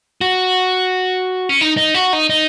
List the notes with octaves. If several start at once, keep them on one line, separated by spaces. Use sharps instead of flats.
F#4
C#4
D#4
D#4
F#4
D#4
D#4